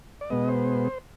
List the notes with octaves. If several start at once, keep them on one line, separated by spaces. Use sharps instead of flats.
D5
B2 G#3 B3 D#5
C5